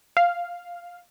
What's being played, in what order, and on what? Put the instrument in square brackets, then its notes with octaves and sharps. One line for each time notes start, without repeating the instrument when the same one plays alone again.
[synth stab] F5